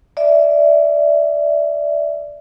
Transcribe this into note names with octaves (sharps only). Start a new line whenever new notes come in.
D5 E5